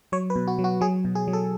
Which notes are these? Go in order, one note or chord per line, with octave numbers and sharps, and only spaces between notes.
F#3 C#5
B4
B2
F#4
F#3
F#4
F#3 G#4
B2
G#4
F#3
A4